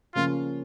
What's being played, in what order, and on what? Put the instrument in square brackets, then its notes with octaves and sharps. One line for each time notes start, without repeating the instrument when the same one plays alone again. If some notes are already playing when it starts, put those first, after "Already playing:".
[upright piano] C#3 F3 A#3 C#4 [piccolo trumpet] F4